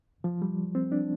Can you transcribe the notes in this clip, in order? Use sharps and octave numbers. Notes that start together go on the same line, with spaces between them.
F3
G3
C4
D4